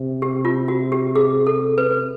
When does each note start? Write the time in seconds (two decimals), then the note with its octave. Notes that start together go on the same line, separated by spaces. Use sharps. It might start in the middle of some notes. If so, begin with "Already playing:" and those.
Already playing: C3
0.22 G4
0.45 F4
0.68 F#4
0.92 G4
1.15 G#4
1.47 A4
1.78 B4